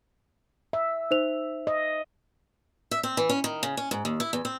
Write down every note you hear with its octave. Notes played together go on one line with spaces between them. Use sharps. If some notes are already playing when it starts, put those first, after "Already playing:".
E5
D#4 C5 F7
D#5
E5
C4
E3
C#4
D#3
C#3
C#4
G#2
D#2
E4
E2
C4